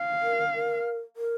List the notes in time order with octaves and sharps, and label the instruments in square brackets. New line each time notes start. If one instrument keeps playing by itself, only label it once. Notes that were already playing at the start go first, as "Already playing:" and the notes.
Already playing: [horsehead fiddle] F5
[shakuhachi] A#4
A#4
A#4